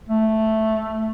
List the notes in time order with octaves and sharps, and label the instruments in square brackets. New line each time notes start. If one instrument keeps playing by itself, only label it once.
[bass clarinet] A3